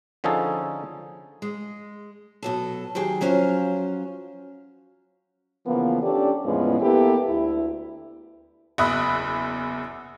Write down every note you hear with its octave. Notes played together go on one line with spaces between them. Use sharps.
D3 F3 C#4 D#4 G#4 A4
G#3
B2 F#3 A4
D#3 F#3 G4 G#4
F3 F#3 C#4 C5 E5 F5
C#3 E3 F3 A#3 B3
C#4 D4 G4 A4 D5
E2 A2 F3 G#3 B3 C#4
A#3 B3 E4 G4 A4 B4
D2 E4
F#1 E2 E5 B5 D#6 F#6